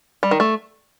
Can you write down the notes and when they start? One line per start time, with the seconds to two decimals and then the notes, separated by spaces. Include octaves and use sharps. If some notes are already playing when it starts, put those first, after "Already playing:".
0.23 G3
0.31 D#3
0.40 A3